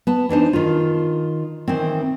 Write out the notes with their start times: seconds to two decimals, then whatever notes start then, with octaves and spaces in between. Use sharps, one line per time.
0.07 B3 A5
0.29 E3 D4 D#4 C5
0.53 D#3 F4
1.68 D#3 E3 C4